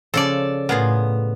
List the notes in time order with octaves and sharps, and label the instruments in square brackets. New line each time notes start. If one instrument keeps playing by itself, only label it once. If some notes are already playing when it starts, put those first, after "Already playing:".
[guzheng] C#3 F3 [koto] A4 D5
[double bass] A2 [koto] B3 [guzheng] F4 G#4 A#4